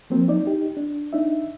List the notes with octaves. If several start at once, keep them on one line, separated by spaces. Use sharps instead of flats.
F3 F#3 A#3 C4
D#4 D5
D#4 G4
D4
D4 D#4 E5